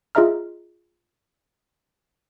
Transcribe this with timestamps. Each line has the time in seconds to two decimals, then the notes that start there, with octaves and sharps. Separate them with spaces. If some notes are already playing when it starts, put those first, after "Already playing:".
0.15 F4 G#4 D#5 E5 A#5 F6